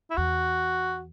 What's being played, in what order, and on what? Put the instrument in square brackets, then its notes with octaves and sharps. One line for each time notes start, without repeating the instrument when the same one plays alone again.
[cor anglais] E4
[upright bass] E2 [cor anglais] F#4